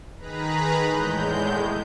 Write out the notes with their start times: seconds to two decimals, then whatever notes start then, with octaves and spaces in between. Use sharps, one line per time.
0.18 D#3 G#4 B4 A#5 B5 F#6
0.85 E2 A2 G#3 G6